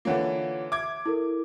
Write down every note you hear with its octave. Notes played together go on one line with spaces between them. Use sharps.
D3 E3 A#3 F4 C#5 F#5
E5 D6 G#6
E4 A4 A#4